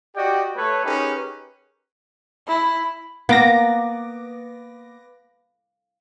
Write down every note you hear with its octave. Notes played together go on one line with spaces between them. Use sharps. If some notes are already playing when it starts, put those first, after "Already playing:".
F#4 G4 D5 D#5 F#5 G5
A3 B4 C#5
C#4 D#4 G4 G#4 A#4 B4
E4
A#3 B3 D6 A#6